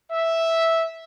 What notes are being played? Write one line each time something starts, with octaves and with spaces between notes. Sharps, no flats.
E5